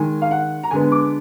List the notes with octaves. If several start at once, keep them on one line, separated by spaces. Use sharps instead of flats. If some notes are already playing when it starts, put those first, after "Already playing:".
Already playing: D#3 G#3 D#4 G#5
F5
F#5
A#5
D3 G#3 B3 G#5
D6